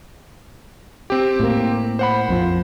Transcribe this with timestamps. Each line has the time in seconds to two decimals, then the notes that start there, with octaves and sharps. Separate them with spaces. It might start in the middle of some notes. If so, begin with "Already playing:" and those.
1.10 C4 G4
1.40 A2 A#3
1.99 C5 F#5 B5
2.29 A#1 F2 F3